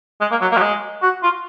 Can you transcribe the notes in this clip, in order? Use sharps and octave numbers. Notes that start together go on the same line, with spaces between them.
G#3
A#3
F#3
A#3
F#3
G#3
F#4
F4